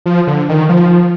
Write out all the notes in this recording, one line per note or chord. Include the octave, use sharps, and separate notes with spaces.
F3
D3
D#3
F3